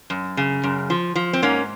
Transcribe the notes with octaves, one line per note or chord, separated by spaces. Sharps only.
F#2
C#3
F#2
F3
F3
C4
G#2 A#3 C#4